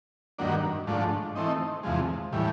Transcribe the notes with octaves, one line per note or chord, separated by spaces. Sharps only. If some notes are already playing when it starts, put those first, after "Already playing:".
G2 D#3 F#3 A#3 D4
G#2 F3 A3 D4
E3 A3 C4 D#4
E2 C3 F3 G#3
A2 E3 G3